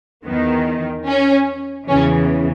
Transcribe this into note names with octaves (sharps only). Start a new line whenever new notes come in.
E2 D#3 B3
C#4
E2 C#3 E3 C#4